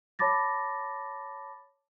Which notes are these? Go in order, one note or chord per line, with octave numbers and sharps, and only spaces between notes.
C#5 A5 B5 D6 A6 A#6